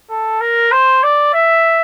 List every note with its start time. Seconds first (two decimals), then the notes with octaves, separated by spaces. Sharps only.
0.10 A4
0.41 A#4
0.72 C5
1.03 D5
1.34 E5